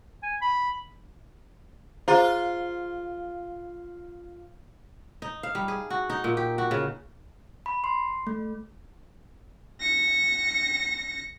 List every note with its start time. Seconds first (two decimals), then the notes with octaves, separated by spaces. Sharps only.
0.23 G#5
0.41 B5
2.08 F4 G#4 C5 A#5
5.22 D#4
5.43 F5
5.55 G3
5.68 G#4
5.90 F#4
6.10 D#4
6.24 A#2
6.37 G4
6.58 F#4
6.71 C#3
7.66 B5
7.84 C6
8.27 A3
9.80 A#6 C#7